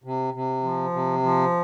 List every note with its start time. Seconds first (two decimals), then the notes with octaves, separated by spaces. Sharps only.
0.04 C3
0.34 C3
0.63 F3
0.93 C3
1.23 F3